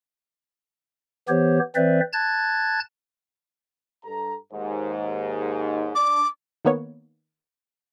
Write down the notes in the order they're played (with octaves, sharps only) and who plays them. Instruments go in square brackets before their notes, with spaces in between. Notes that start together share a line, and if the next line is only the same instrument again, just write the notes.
[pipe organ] E3 B3 G4 C5 C#5
E3 C4 B4 C5 D5 E5
A5 F#6 G#6 A6
[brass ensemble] G2 A4 A#5
D#2 G#2
[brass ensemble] D4 [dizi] D6
[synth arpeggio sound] D#3 A#3 B3 C#5